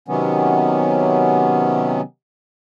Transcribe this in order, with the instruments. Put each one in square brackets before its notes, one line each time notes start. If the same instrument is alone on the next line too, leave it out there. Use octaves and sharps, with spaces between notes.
[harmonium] C3 D#3 F#3 B3 C#4